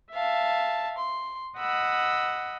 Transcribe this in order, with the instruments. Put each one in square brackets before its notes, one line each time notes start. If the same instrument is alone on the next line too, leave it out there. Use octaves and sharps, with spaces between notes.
[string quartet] E5 F5 A5
C6
D#5 F#5 B5 E6